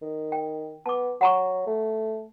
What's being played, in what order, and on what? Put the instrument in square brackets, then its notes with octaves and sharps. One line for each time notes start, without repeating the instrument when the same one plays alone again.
[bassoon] D#3
[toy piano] G5
[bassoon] B3 [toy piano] A5 D6
[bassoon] F#3 [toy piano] F#5 A#5 C#6
[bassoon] A3